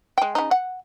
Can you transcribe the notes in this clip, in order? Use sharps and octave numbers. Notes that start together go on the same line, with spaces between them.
G#3 G5
C#3 D#4
F#5